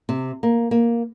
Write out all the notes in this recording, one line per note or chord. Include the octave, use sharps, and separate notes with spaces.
C3
A#3
A#3